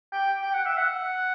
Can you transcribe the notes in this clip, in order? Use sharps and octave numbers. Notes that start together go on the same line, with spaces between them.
G5
G5
F#5
E5
F#5